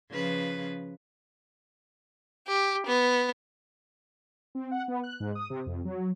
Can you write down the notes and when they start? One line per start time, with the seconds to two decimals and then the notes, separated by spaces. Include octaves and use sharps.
0.11 C#3 F3 B4
2.48 G4
2.86 B3
4.55 C4
4.71 F#5
4.88 B3
5.03 F#6
5.20 G#2
5.35 D#6
5.50 C3
5.66 F2
5.85 F#3